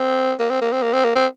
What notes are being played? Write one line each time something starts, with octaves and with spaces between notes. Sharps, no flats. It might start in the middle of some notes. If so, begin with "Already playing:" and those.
Already playing: C4
A#3
C4
A#3
C4
A#3
C4
A#3
C4